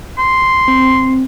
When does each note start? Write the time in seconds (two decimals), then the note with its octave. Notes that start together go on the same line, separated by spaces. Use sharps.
0.18 C6
0.68 C4